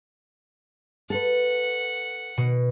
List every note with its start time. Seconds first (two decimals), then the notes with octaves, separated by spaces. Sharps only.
1.10 A4 B4 F#5
2.37 B2